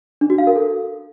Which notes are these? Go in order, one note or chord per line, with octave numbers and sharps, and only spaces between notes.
D4
F#4
F5
A#4
A4